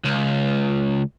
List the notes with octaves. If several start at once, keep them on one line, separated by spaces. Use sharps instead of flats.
C#2